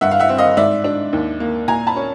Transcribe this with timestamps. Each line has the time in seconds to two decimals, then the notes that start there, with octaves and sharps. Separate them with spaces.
0.01 G2 E5 F#5
0.11 F5
0.20 E5 F#5
0.29 C4
0.38 D#5 F5
0.57 G#2 D5 E5
0.84 D4
1.13 D#2
1.40 A#3
1.68 A#2 G#5 A#5
1.87 A5 B5
1.96 C#4